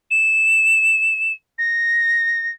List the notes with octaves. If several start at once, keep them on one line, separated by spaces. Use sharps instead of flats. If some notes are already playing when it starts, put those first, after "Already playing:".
E7
A#6